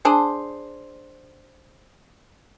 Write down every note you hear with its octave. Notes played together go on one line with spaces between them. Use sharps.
D4 G#4 C5